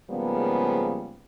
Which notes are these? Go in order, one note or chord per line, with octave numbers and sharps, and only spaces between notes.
G#2 C#3 F3 G3 A#3 B3